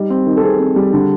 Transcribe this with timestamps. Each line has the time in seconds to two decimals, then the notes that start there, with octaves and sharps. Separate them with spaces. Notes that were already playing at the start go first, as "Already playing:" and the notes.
Already playing: G3 D#4
0.10 C4
0.26 D#3
0.37 A4
0.43 C4 G#4
0.59 C4
0.76 G3
0.93 D3